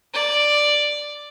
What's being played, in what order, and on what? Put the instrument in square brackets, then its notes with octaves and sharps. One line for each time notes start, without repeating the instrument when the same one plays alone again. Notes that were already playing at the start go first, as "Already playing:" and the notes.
[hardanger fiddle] D5